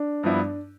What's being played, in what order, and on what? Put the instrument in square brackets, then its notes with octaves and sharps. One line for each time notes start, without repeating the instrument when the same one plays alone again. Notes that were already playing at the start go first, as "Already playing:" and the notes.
Already playing: [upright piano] D4
[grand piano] G2 F3 B3 E4